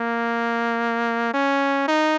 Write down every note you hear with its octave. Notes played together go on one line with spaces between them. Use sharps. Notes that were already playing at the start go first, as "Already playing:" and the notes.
Already playing: A#3
C#4
D#4